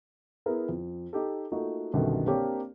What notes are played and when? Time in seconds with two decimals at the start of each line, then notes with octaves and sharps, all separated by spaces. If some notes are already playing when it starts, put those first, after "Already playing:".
0.46 B3 E4 G#4 A#4
0.69 F2
1.13 D#4 G4 A4
1.52 A3 A#3 D#4 F4 F#4
1.93 C2 F#2 B2 D3 D#3
2.27 A#3 C4 D4 G4 A#4 C#5